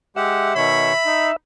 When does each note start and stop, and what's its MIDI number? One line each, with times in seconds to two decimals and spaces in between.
0.16 0.53 56
0.16 0.53 67
0.16 1.36 76
0.16 0.53 78
0.56 0.93 47
0.56 0.93 51
0.56 0.93 73
0.56 1.32 83
1.06 1.31 63